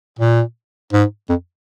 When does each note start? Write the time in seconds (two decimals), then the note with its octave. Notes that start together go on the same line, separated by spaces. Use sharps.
0.19 A#2
0.93 G#2
1.30 F2